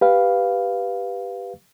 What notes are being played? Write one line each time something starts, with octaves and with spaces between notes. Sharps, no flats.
G4 B4 F5